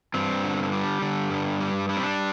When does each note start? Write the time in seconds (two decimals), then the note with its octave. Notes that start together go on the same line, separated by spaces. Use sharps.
0.14 G2 C4
0.43 D3
0.72 G3
1.02 D3
1.30 G2
1.60 G3
1.89 G3 D4
1.97 C4
2.03 D4